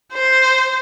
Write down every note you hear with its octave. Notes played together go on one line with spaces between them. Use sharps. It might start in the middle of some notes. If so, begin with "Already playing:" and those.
C5